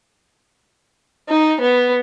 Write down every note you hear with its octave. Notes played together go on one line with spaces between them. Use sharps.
D#4
B3